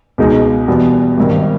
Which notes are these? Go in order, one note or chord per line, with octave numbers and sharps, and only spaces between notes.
C#2 B2 G#3 D#4
E2 B2 G3 B3
G#1 G2 D#3